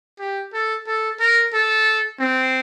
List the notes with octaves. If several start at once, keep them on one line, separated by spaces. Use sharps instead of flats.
G4
A4
A4
A#4
A4
C4